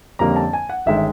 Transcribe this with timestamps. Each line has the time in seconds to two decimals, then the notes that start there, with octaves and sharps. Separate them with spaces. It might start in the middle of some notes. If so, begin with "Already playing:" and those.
0.19 F2 D3 G3 A#3 C#4 A#5
0.36 A5
0.53 G#5
0.69 F#5
0.86 G1 D#3 G#3 C#4 E5
0.97 E5